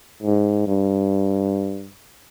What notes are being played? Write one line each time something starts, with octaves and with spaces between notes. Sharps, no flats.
G#2
G2